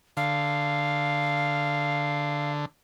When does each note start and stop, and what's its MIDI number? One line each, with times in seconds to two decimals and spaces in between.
0.17 2.65 50
0.17 2.51 77